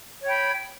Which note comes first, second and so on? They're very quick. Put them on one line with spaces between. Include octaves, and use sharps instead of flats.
C#5 G5 B5